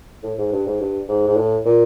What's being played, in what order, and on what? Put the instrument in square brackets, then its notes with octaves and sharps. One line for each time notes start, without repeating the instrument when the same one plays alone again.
[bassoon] A2
G#2
G2
G#2
G2
G#2
G#2
A2
A#2